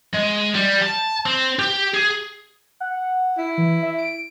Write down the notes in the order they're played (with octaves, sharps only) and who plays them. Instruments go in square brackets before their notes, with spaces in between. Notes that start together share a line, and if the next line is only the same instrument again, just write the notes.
[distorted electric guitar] G#3
G3
A5
C4
G4
G#4
[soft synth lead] F#5
[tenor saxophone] E4
[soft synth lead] E3
E5
D7